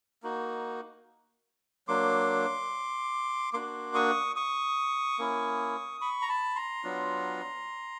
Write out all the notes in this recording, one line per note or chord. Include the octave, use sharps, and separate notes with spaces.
A#3 D#4 F#4
F#3 A#3 D4 C6 D6
A#3 D4 F#4 C6 D6
C#6 D#6
C#6 D#6
A#3 C#4 E4
B5 C#6
A#5
A5 B5
A#5 C6
F#3 B3 D4 F4